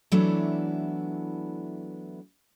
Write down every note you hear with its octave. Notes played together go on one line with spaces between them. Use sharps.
E3 F#3 A3 B3 D4 E4